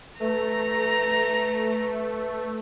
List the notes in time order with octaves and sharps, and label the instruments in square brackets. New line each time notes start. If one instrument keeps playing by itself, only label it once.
[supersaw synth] A3 [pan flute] B4 [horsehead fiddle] A#5